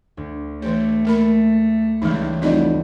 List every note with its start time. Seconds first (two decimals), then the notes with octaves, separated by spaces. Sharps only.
0.17 D2
0.62 E3 A3 G4 C#5
1.05 A#3 A#4 B5
2.02 C#2 E3 G3 G#3 D#4
2.42 F1 G3 B3 E4 D5 D#5